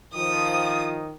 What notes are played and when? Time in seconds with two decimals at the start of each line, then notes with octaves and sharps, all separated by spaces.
0.14 D#3 F3 D#6